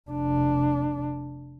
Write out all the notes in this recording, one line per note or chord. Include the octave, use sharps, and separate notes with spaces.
F1 D4